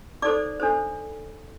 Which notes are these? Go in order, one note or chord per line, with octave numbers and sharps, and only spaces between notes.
D#4 A4 C5 D5 D6
D4 A4 C5